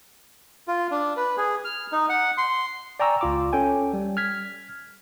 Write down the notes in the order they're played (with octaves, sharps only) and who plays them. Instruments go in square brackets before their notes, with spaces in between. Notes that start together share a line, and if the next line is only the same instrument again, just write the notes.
[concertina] F4
D4
B4
G#4
F6
D#4
F#5
C6
[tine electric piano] D5 G5 G#5 A#5 C#6 E6
C#2 F4 D6
C#4 A4 G5 G#5
G3
F6 G#6 B6